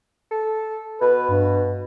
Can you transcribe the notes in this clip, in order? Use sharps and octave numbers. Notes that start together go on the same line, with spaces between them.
A4
B2 B4
G2